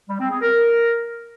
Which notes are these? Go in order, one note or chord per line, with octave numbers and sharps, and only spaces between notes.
G3
C4
G#4
A#4